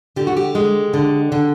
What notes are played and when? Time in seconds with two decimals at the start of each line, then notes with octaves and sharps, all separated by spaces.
0.16 D3 G4
0.27 F#4
0.37 G4
0.55 G#3
0.94 D3
1.32 D3